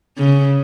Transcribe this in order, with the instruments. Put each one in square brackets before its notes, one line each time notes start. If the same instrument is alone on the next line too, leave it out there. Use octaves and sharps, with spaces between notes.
[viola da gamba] C#3